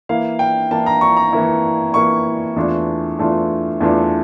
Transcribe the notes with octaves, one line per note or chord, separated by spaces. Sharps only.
E3 A#3 E4 F5
G5
E3 A#3 E4 A5
A#5
C#6
A#5
E3 A#3 E4
E3 A#3 E4 C#6
E2 E3 A3 D4 F4
E2 E3 A3 D4 F4
E2 E3 A3 D4 F4